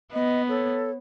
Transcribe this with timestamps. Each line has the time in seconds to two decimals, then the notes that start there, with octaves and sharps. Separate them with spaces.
0.13 B3 D#5
0.48 A4 C#5